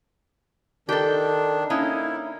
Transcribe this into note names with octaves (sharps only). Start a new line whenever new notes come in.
D#3 D4 G4 A4
A#3 C#4 D#4 E4